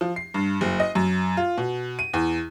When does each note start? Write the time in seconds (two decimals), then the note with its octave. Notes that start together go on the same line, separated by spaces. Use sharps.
0.01 F3
0.16 C7
0.34 G2
0.61 F#1
0.80 D#5
0.95 F#2
1.37 F4
1.58 B2
1.99 D#7
2.14 E2